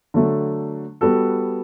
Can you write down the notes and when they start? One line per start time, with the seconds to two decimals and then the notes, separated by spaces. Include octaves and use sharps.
0.14 D3 F#3 A3
1.01 G3 B3 F#4 A4